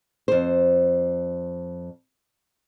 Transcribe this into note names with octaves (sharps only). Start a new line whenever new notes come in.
F2 C5